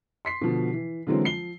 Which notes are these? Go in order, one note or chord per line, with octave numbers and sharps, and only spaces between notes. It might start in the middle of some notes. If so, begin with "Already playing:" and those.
C6 B6 C7
B2 D3 F3
E3
D3 E3 F#3 G#3 C4 C#4
F3 C7 G7